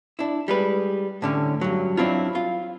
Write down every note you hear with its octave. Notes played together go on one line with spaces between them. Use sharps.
D4 E4
G3 G#3 B4
A2 D3 C#4
G2 F#3
F#3 C4 D4 E4 F4
F4